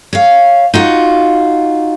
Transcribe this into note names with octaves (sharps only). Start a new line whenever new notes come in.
C#5 F5
D#4 F4 F#4